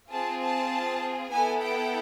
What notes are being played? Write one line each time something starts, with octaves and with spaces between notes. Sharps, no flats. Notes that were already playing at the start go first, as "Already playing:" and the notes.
C4 F4 G#4 A5
A5
B3 E4 A4 G#5
G5